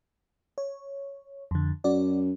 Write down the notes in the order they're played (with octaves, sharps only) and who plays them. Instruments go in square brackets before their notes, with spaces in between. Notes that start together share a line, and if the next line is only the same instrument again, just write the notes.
[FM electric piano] C#5
F2 D3
[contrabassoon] F#2 [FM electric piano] F#4 D5